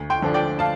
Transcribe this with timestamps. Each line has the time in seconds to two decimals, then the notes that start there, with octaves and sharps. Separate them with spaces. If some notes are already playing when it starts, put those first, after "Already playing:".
Already playing: D2
0.10 G5 C6
0.22 D3 F3 D4
0.34 D5 G5
0.59 F5 A5